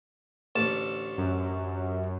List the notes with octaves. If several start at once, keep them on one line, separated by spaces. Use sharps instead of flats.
A1 D2 A5
F#2